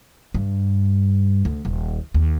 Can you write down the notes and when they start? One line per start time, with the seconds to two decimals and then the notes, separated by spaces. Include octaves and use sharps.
0.34 G2
1.45 D2
1.65 D#1
2.14 D#2